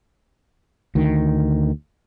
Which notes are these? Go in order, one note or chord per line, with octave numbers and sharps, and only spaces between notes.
D2 D#3